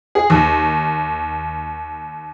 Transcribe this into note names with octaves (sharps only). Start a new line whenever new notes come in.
G#4
D#2